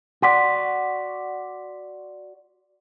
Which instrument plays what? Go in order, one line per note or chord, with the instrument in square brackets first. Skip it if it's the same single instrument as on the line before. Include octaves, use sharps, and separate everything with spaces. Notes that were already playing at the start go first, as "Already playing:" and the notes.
[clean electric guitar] F#4 D5 [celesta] F#5 C6 B6